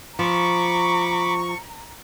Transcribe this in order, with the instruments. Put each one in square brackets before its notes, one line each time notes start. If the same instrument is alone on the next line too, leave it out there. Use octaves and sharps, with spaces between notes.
[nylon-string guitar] F3 [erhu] A#5 [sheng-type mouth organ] B5 D6 [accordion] C#6